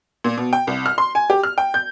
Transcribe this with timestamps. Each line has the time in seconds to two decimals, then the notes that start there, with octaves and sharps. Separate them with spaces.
0.24 A#2
0.37 B2
0.53 G5
0.67 C2
0.86 F6
0.98 C6
1.15 G#5
1.30 G4
1.43 F6
1.58 G5
1.74 G6